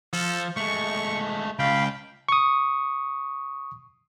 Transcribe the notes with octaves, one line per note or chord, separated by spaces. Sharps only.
F3 A4
G#3 A3 C#6
C#2 F5 G5 B5
C#6 D#6